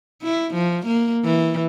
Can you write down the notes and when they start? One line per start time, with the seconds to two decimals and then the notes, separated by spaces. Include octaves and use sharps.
0.23 E4
0.54 F3
0.86 A#3
1.24 E3